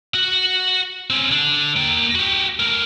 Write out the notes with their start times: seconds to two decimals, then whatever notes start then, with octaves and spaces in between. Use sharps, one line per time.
0.14 F#4 F#5
1.10 C4 C#4
1.31 D3 D4
1.76 A#3 G5
2.15 F#4 G4
2.60 A3 A#4